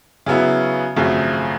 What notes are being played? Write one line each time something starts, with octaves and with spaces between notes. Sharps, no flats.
C#3 F#3 B3 E4
G#1 F#2 C#3 F3 A3